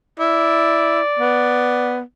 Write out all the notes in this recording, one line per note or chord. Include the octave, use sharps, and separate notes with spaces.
E4 D5
B3